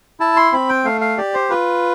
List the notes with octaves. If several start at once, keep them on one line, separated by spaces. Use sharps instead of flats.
E4 A5
C6
C4 B5
G5
A3 F5
F5
G4 D5
C5
F4 B4